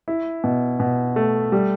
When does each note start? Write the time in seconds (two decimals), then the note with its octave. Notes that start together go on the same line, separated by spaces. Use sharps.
0.08 E4
0.44 B2
0.80 B2
1.16 A3
1.52 G3